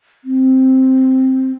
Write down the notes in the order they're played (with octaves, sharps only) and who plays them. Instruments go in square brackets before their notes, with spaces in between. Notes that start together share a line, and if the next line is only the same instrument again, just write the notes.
[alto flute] C4